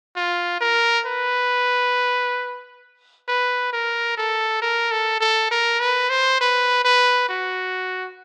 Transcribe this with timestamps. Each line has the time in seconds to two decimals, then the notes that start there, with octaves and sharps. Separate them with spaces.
0.16 F4
0.61 A#4
1.06 B4
3.28 B4
3.73 A#4
4.17 A4
4.62 A#4
4.92 A4
5.21 A4
5.51 A#4
5.80 B4
6.10 C5
6.41 B4
6.84 B4
7.29 F#4